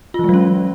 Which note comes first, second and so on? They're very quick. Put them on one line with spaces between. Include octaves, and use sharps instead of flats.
F4 E3 G#3 F#3 C#4